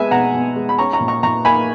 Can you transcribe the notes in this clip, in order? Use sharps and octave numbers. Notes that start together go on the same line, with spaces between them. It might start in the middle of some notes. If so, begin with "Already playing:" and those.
Already playing: G#3 B3 E5 G#5
B2 F#5 A#5
B2
G#3
B5
C#4 A#5 C#6
A#5 C#6
A#2
A#5 C#6
A#2 A#5 C#6
A#3 G#5 B5